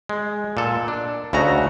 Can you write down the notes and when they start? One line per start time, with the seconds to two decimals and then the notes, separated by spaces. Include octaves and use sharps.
0.09 G#3
0.57 A#2 A4
0.88 D4
1.33 D2 C#3 A3 F#4 D#5 A#5